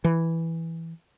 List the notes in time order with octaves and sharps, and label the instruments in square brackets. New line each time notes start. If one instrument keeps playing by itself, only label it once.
[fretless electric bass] E3